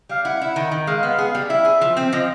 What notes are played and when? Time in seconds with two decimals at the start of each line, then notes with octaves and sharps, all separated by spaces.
0.09 G3 F5
0.25 E4 F#5
0.41 E4
0.56 D#3
0.72 D#3
0.87 G#3 F5
0.98 F5
1.03 B3
1.09 F5
1.17 G#4 F#5
1.27 F5
1.35 G3
1.50 E4 E5
1.65 G#4
1.81 F3
1.97 C4
2.12 F3 D#5